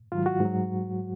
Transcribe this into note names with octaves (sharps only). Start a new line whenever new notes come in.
G#2 D#3 F#3 F4
F#4
G#2 F#3